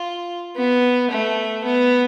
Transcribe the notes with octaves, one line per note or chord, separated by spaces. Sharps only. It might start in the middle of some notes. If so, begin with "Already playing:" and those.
Already playing: F4
B3
A3
B3